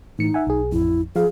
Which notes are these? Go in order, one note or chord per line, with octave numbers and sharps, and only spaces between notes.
A2 E3 D#4 C#7
E5 F#5 G#5
B1 G#4
A1 F2 E4
F3 G#4 F5